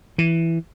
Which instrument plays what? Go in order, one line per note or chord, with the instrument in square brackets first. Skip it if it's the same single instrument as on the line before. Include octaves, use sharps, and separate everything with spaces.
[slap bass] E3